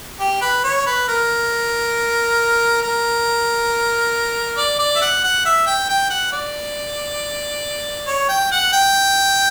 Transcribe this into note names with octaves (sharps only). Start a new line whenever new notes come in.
G4
B4
C#5
B4
A#4
A#4
D5
D5
E5
F#5
F#5
E5
G5
G5
F#5
D5
C#5
G5
F#5
G5